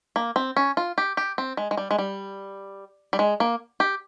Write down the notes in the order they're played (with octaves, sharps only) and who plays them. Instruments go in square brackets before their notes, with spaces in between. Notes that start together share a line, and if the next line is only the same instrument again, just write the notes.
[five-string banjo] A#3
C4
C#4
F4
G4
G4
C4
G#3
G#3
G3
G#3
G3
G3
G#3
A#3
G4